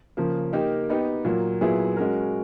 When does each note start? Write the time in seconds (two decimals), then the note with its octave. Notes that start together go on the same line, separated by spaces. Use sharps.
0.17 C#3 F3 A#3
0.53 A#3 D#4 G4 A#4
0.89 B3 D#4 G4
1.25 A#2 F#3 A#3
1.61 A#2 F#3 B3 E4 G#4
1.97 G#3 C#4 F#4 A#4